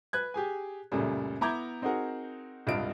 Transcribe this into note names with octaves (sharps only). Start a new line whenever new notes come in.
B4 F#6 G#6
G4 G#4 G#5
C#2 F#2 A#2 C#3 G3 A3
B3 E4 A#5 D6 G6 G#6
C4 D#4 F#4 G#4 A#4 F#5
E1 C2 G2 F4 D#5 D7